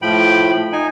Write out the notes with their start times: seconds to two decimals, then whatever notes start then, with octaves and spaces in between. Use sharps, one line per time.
0.02 A2 F3 G5 B5
0.72 D#4 G#5